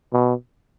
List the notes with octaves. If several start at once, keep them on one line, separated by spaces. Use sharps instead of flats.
B2